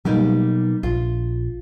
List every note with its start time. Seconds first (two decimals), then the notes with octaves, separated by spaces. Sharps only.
0.05 B2 F#3 G3 A#3 D#4
0.83 A#1 F4